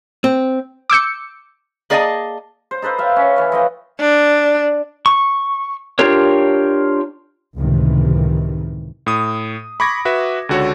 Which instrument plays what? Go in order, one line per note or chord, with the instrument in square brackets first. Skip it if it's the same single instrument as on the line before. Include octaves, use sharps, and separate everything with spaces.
[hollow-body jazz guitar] C4
[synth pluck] D6 E6 G6 C#7
[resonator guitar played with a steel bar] A#3 G#4 D5 D#5 G5 A5
[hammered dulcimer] C5
D#4 A4 B4 C5
E5 F5 G5
C#4
E3 C#5
F3 D#5 G5
[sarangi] D4
[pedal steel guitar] C#6
D4 F4 G4 A#4 C#5
[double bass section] C#2 F#2 A2 C3 D#3 E3
[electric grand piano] A2 D#6
B5 C#6 D6 G#6 A#6
F#4 B4 E5
C#2 D3 F#4 A4 C#5